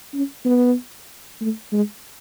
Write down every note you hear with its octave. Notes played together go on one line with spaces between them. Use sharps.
C#4
B3
A3
G#3